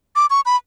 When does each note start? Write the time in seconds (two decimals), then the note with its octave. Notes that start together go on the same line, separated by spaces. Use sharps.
0.16 D6
0.30 C#6
0.46 B5